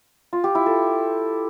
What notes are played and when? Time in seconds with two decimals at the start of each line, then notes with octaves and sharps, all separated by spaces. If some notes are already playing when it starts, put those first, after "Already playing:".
0.33 F4
0.44 G4
0.55 E4
0.66 A4